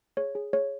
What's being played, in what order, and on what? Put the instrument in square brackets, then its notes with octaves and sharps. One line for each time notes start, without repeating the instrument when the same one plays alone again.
[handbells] G#4 C#5
G#4
G#4 C#5